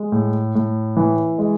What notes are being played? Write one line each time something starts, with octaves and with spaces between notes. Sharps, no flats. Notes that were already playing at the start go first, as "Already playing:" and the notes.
Already playing: G#3
A2
A2
E3
G#3